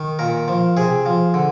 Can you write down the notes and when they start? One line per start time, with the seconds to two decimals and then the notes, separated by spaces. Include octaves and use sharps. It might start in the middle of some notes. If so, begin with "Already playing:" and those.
Already playing: D#3
0.19 A#2 A#4
0.48 F3
0.77 C3 G#4
1.06 F3
1.34 D3